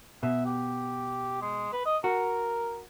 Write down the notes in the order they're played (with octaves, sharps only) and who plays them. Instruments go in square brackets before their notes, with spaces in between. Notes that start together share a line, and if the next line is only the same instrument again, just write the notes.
[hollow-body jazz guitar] B2 [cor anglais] E5
[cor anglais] G4
G#3
B4
D#5
[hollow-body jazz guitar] F#4 [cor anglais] A#4